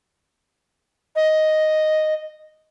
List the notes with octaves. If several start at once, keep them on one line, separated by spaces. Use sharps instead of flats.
D#5